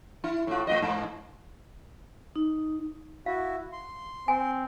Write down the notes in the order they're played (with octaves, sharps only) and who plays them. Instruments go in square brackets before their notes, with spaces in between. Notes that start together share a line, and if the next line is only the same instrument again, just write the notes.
[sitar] E4
A2 F4
A3 F4 D#5
G#2
[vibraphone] D#4
[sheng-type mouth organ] E4 F#4 [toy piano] F5
[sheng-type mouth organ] C6
[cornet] C4 [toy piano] G#5